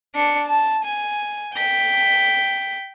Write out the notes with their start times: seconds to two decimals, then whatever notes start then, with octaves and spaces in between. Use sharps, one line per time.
0.15 D4 C#7
0.47 A5
0.84 G#5
1.54 G5 B6